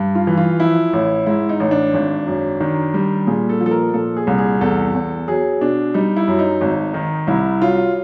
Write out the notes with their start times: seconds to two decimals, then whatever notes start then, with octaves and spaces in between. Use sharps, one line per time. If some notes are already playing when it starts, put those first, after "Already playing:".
Already playing: G2
0.15 F4
0.27 E3
0.37 F4
0.60 F3 E4
0.93 A1
1.27 G#2 E4
1.49 D#4
1.60 A1
1.71 D4
1.94 G#1
2.27 F#2
2.60 D#3 D4
2.94 G3
3.27 A#2 G#4
3.49 A4
3.61 F3
3.66 A4
3.71 A#4
3.94 A#2 A4
4.17 G#4
4.27 C2
4.38 G#4
4.61 E2 A4
4.94 E2
5.27 F#3 G#4
5.61 B2 D4
5.94 G3 D#4
6.16 E4
6.28 F#2
6.39 D#4
6.61 G#1
6.94 D#3
7.27 C2 E4
7.61 F#3 F4